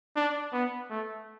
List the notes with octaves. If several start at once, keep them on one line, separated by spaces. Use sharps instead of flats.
D4
B3
A3